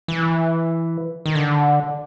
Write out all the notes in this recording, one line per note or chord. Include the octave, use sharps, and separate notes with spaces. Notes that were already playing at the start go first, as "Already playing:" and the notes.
E3
D#3
D3